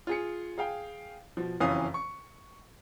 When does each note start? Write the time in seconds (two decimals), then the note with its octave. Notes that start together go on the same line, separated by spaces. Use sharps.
0.07 F4 G#4 C#7
0.58 G#4 F5 G5
1.37 B2 F3
1.60 F#1 F2 E3 C#4 F5 D#6
1.94 C#6